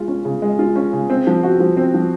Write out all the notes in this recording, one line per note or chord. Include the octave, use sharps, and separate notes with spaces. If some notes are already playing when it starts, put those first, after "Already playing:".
Already playing: G#3 F4
C#4
C#3
G#3
F4
C#4
C#3
C4
F3
F#4
F3
C4
F3